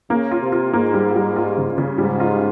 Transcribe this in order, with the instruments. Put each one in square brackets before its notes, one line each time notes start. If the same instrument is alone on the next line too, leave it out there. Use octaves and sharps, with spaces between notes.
[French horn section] C#3 [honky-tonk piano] A#3
[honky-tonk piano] F4
[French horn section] C3
[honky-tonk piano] F4
[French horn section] G#2 [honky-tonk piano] A#3
[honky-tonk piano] G3
G3
F4
C#3
C#3
[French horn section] G#2 [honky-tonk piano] G3
[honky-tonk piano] F4